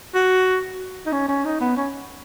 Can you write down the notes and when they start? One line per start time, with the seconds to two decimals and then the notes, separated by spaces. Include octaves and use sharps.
0.15 F#4
1.06 D#4
1.12 C#4
1.28 C#4
1.45 D#4
1.61 B3
1.77 C#4